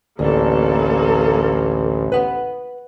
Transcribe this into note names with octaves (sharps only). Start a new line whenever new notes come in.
A1 D2 A#3 A4
B4 F#5